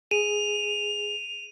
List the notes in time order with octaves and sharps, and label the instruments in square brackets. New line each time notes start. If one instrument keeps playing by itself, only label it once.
[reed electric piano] G#4 [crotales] D#7 [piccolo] F7